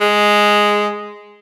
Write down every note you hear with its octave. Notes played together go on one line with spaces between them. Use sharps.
G#3